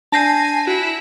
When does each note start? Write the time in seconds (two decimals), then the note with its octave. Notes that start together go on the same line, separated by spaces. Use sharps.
0.12 D4 G#5 A5 G6 A#6 C7
0.67 E4 F#4